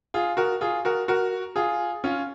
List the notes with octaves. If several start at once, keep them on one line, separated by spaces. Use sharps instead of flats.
F4 G#4
F#4 A#4
F4 G#4
F#4 A#4
F#4 A#4
F4 G#4
C#4 F4